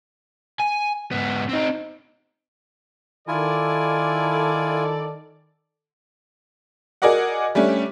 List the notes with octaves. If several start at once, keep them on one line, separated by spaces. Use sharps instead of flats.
G#5
G#2 B3
C4 D#4
D#3 E4 F4 A4 D5 G#5
F#4 G#4 A#4 D5 D#5 F#5
G3 A3 C#4 D4